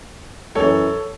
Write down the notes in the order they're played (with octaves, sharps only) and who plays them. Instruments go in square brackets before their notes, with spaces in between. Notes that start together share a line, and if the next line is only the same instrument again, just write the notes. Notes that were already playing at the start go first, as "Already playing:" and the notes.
[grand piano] F#2 E3 A4 C#5